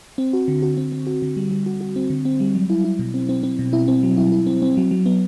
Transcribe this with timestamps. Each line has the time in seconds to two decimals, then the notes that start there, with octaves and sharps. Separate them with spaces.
0.18 C4
0.33 F#4
0.48 D3
0.62 F#4
0.77 C4
0.92 C4
1.07 F#4
1.22 D3
1.36 G3
1.51 G3
1.66 F#4
1.81 F#4
1.96 C4
2.10 D3
2.25 C4
2.40 G3
2.55 F#3
2.70 E4
2.84 E4
2.99 B2
3.14 C4
3.29 C4
3.43 C4
3.59 B2
3.73 E4
3.88 C4
4.03 F#3
4.17 E4
4.32 E4
4.46 C4
4.62 C4
4.77 F#3
4.91 F#3
5.06 B3